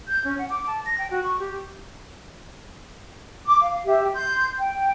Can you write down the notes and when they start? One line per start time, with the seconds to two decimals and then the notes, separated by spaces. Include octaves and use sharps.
0.08 G6
0.24 C#4
0.38 F#5
0.50 D6
0.67 A5
0.86 A#6
0.98 G5
1.11 F#4
1.24 C#6
1.39 G4
3.45 D6
3.62 F5
3.85 G4 E5
4.13 C6 G6
4.59 G5